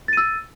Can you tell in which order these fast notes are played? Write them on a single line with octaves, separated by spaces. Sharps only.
A6 D#7 E6